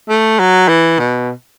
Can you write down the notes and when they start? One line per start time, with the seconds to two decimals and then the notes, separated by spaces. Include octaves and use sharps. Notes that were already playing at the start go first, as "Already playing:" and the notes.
0.09 A3
0.39 F#3
0.68 E3
0.99 B2